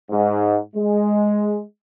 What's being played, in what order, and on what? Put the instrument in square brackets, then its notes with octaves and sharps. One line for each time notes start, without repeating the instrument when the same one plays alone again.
[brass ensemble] G#2
G#3